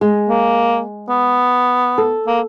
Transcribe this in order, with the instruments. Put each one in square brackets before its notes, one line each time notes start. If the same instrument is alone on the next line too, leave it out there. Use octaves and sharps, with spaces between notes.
[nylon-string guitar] G#3
[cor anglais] A#3
B3
[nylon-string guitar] A4
[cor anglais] A#3